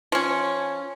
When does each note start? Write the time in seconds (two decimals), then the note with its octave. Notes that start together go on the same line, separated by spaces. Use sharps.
0.12 F3 C#4